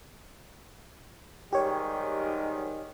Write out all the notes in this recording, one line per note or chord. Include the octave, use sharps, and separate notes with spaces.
G#2 D#3 G3 G4 C#5